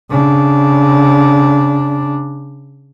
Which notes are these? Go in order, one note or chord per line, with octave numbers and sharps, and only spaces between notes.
C#3 D4